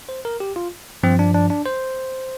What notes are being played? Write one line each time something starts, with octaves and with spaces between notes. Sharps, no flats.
C5
A#4
G4
F4
G2 F3 C4
D4
D4
D4
C5